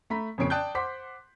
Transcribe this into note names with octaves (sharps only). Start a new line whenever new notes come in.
A3 A#5 B5 B6
F2 A#2 C#3 C#5 C7 D7
D5 G5 A5 D#6 F#6 G6
C5 F#5 C6 D6 B6